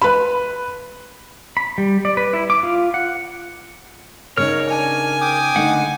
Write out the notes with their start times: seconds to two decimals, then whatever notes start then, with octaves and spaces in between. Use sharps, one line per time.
0.02 B4 B5
1.57 B5
1.78 G3
2.05 D5
2.17 B4
2.33 E4
2.50 D6
2.63 F4
2.94 F#5
4.38 C#3 C#4 D#4 A#4 C#5 F6
4.69 D4 G#5
5.21 G5 D6 D#6
5.56 D3 A3 D#4 F#5